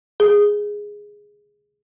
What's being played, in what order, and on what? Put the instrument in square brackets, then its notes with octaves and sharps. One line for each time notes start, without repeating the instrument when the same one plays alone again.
[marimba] G#4